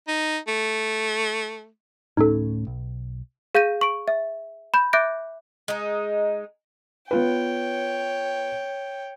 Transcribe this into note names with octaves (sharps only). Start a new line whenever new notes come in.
D#4
A3
D1 A2 C#4 D#4 A4
B1
G#4 F5 G6 A#6 D#7
C#6 D7
E5
B5 G6
E5 D6 F#6 G6 A#6 D7
G#3 D#4
B3 F4 B4 C#5 G5